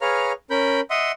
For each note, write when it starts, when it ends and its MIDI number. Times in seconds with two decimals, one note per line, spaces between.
0.01 0.32 68
0.01 0.32 71
0.01 0.32 73
0.01 0.32 77
0.01 0.32 82
0.01 0.32 89
0.50 0.81 61
0.50 0.81 70
0.50 0.81 83
0.50 0.81 91
0.90 1.12 75
0.90 1.12 76
0.90 1.12 78
0.90 1.12 84
0.90 1.12 87